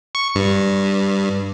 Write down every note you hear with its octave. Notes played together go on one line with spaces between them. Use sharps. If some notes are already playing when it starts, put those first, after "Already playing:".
C#6
G2